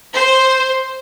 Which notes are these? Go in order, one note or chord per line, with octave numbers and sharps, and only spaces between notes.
C5